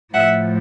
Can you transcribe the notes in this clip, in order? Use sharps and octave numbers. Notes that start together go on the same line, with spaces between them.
A2 F3 A3 E5 F#5